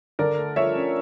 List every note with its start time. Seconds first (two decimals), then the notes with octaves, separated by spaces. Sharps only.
0.19 D3 A#4 D5
0.38 A3
0.56 F3 C#5 E5
0.76 C#4